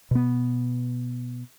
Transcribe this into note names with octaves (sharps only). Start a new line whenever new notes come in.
B2 B3